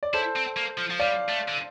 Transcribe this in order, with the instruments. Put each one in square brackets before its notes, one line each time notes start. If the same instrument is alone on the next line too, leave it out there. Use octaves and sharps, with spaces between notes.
[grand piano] D5
[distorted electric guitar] E4 [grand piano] A4 C5
[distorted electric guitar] C4
A#3
F3
F3
[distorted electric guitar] G3 [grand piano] D5 F5
[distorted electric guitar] A3
D3